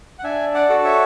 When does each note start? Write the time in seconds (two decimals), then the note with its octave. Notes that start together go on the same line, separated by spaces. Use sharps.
0.19 F#5
0.24 D4 E5 G#5
0.54 D5 F#5
0.69 F#4 A4
0.85 C#5 E5